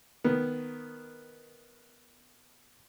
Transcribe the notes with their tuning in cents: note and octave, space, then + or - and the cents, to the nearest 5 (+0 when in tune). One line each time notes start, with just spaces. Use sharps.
D#3 -5 B3 +0